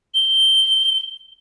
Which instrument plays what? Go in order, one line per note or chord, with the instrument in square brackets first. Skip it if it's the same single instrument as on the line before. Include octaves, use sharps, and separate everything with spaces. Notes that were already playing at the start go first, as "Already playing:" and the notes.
[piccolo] G7